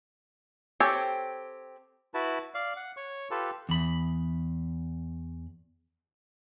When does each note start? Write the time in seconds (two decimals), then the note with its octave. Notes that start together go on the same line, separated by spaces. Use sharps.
0.80 C4 G4 A4 C#5 G#5
2.14 E4 F#4 B4 A5
2.54 D5 F5
2.76 F#5
2.97 C#5 C#6
3.31 F4 G4 A4 B4 A5
3.69 E2 B5